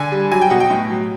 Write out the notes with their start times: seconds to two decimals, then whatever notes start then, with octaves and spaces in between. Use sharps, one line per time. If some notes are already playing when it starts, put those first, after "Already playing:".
Already playing: D3 G#5
0.12 G3
0.32 F#3 G#5
0.41 G5
0.50 B2 F#5
0.60 G5
0.70 A2
0.90 F#3